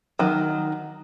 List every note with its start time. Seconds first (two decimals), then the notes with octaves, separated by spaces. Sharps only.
0.19 D#3 F#3